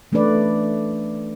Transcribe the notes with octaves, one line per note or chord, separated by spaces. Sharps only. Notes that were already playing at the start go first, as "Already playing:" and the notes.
E3 A3 C#4 D4 B4 D5